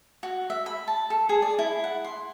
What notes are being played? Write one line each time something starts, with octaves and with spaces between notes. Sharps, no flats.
F#4
E5
B5
A5
A4
G#4
D5
E4
F#5
C6